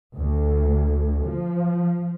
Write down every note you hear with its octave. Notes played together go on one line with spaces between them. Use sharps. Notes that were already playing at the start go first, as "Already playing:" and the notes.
D2
F3